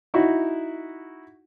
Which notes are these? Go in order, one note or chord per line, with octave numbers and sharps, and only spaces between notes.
D#4 E4 F#4